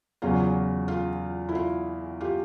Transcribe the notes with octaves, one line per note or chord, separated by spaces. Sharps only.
E2 C#3 F#3 F4
F4
E4
F4
F4 G4